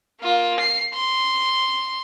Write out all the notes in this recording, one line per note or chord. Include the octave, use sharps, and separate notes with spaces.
A#3 F4
C7
C6